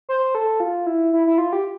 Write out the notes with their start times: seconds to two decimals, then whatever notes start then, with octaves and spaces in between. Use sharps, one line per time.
0.09 C5
0.35 A4
0.60 F4
0.86 E4
1.13 E4
1.27 E4
1.38 F4
1.53 G4